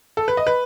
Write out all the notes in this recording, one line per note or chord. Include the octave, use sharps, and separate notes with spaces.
A4
B4
D#5
B4